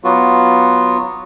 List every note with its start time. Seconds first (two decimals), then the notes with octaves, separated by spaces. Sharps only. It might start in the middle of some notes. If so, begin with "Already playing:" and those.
0.04 F#3 B3 F4 F#4